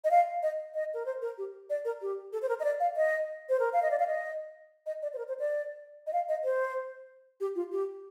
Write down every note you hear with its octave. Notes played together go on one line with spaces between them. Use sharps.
D#5
F5
D#5
D#5
A#4
C5
A#4
G4
D5
A#4
G4
A4
C5
A#4
D#5
D5
F5
D#5
C5
A#4
F5
D#5
D5
F5
D#5
D#5
D5
C5
A#4
C5
D5
D#5
F5
D#5
C5
G4
F4
G4